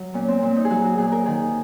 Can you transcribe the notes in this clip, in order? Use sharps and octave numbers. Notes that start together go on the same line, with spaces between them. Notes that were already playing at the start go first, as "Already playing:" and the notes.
Already playing: F#3
A#2 C#4
C4
A#2 C4
D#4
G#4
F#3 F#4
F#4
A#2 G#4
A#4
D#3 G#4